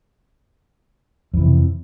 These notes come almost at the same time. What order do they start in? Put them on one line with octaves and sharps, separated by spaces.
F2 E3 C3